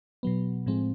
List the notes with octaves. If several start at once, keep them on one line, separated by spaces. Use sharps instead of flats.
B2 F#3 B3
A2 F3 G#3 C4